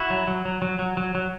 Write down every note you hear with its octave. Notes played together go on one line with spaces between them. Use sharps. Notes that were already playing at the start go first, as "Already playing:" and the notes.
Already playing: E4 F#4
F#3
F#3
F#3
F#3
F#3
F#3
F#3